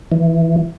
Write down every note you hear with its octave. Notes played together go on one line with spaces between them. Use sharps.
E3